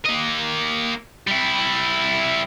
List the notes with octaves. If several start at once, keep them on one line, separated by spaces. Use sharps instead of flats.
A#3 D#5
G3 E4